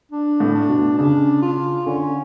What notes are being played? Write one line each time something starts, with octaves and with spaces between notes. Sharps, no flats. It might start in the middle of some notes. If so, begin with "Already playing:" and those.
D4
A2
D4
B2
C#3 D4
F4
D3 C#4